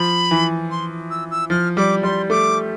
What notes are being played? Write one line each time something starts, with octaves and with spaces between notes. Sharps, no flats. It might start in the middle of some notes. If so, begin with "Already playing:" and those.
Already playing: F3 B5
E3
C6
E6
E6
F3 F6
G3 D6
G3 C6
A3 D6